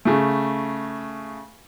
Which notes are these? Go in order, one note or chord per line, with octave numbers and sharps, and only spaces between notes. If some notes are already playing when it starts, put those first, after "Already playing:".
C#3 A3